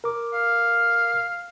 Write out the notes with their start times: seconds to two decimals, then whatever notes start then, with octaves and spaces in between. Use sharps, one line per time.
0.04 A#4 D6
0.34 F5